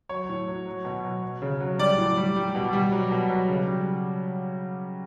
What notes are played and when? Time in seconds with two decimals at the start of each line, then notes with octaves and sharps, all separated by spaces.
0.09 F#3 C#5
0.29 A2
0.48 F#3
0.67 F#3
0.85 B2
1.04 F#3
1.23 F#3
1.42 C#3
1.60 F#3
1.79 G3 D5
1.98 A2
2.17 G3
2.36 G3
2.55 B2
2.73 G3
2.92 F#3
3.11 B2
3.30 F#3
3.48 C#3
3.68 G3